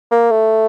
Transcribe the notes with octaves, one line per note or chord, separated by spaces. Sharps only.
A#3
A3